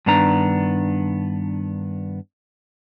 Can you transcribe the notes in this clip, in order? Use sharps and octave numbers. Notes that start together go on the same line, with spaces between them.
G2 D#3 B3 D4 A#5